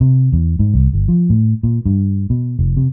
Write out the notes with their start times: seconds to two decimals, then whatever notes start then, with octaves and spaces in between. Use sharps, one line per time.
0.01 C3
0.32 E2
0.59 G#2
0.74 C2
0.93 G1
1.08 F3
1.30 A2
1.63 A#2
1.85 G2
2.30 B2
2.59 F1
2.77 C3